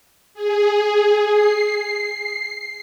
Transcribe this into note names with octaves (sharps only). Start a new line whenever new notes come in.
G#4
C7